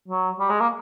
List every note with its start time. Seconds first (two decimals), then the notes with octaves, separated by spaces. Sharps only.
0.08 F#3
0.39 G3
0.50 G#3
0.60 A#3